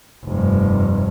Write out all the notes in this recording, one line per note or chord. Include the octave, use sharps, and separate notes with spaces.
F1 G2